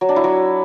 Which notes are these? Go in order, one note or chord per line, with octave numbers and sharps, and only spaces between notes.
F#3
D4
E4
F#3